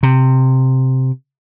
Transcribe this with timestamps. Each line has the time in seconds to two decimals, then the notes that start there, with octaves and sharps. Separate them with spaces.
0.03 C3